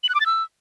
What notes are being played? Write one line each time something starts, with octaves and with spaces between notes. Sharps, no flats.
F#7
F#6
D6
A6
E6